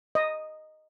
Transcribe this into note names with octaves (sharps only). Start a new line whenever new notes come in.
D#5